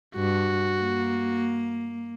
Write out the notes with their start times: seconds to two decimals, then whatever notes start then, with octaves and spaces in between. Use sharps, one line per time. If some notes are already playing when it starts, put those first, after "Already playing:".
0.16 G2 F#4
0.79 A#3